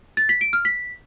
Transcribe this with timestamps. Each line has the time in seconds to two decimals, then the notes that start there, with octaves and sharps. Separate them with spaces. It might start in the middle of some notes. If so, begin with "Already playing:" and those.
0.17 A6
0.29 B6
0.41 D7
0.53 F6
0.65 B6